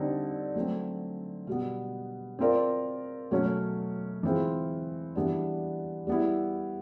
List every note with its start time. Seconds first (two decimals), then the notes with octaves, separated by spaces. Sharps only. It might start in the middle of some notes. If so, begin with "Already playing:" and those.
Already playing: D3 G3 C4 D#4
0.56 F#3 A3 C4
1.47 B2 G3 B3
2.39 C4 F4 A#4 D5
3.31 B2 F#3 A3 C#4
4.23 E3 G#3 C4 F4
5.15 E3 G3 B3 D4
6.07 G3 B3 E4